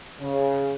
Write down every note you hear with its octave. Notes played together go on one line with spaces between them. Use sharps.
C#3